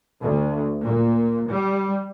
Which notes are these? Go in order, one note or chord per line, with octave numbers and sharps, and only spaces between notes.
D2
A#2
G3